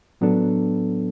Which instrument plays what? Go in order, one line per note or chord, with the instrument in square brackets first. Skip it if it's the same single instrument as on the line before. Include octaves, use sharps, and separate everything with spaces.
[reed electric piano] A2 F#3 B3 D4 A4